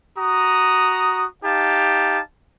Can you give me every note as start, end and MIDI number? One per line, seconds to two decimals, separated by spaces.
0.18 1.26 66
0.18 1.26 82
0.18 1.26 87
1.44 2.20 63
1.44 2.20 67
1.44 2.20 77
1.44 2.20 81